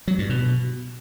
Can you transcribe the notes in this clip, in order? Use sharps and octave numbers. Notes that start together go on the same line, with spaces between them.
F#3
G2
B2